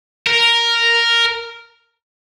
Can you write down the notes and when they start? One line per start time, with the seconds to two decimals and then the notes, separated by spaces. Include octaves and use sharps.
0.27 A#4